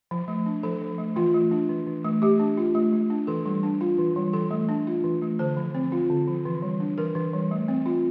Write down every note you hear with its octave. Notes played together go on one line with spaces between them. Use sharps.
F3
A3
D4
F3 A4
F3
A3
E3 F4
A3
D4
E3
E3
A3
A3 G4
D4
F4
A3
A3
D4
E3 A4
G3
D4
F4
E3
G3
E3 A4
A3
D4
F4
E3
A3
D3 C5
F3
C4
F4
D3
F3
E3
G3
D4
E3 A#4
E3
G3
A3
C4
F4